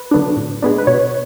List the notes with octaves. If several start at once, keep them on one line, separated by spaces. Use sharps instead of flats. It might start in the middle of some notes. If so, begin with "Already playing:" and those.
Already playing: B4
D3 F#3 B3 D4
A2
G#3 B3 D4
B4
B2 C#5